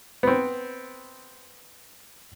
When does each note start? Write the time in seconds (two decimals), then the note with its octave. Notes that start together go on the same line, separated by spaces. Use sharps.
0.23 B3 C4